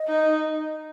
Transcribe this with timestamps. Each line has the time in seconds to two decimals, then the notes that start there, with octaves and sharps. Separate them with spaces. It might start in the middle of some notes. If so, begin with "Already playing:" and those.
Already playing: D#5
0.08 D#4